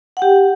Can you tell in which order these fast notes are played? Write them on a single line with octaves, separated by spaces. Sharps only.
F#5 G5 G4